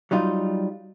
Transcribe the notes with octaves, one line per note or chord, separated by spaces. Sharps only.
F#3 G3 D#4 F4